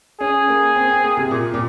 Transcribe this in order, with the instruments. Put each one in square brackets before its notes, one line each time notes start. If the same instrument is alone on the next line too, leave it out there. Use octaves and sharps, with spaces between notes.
[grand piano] C#4 [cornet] G#4
[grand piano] A#3
C4
C4
A#3
C3
A#2
A#2